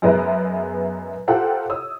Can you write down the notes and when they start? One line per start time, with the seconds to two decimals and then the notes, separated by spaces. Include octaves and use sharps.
0.02 F#2 G#3 B3 A#4 B4 E5
1.28 F4 G4 A4 A#4 C5 F#5
1.69 C#5 D#6 E6